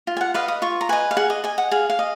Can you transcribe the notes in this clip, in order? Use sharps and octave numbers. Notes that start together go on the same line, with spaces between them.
F4
G#5
F#5
B4 D#5 F5
D#6
F4 C#6
A#5
B4 D#5 G#5
F5
G#4 F#5
D#5
D#5 G#5
F#5
G#4 F5
F5
D#5